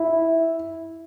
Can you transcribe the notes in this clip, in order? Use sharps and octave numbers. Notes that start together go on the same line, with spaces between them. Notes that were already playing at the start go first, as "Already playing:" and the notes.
Already playing: E4